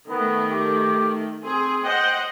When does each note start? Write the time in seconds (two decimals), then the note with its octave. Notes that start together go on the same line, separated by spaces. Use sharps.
0.10 D#3 A3 B3
0.51 G4
1.44 C4 G#4
1.84 C5 D#5 F#5 G5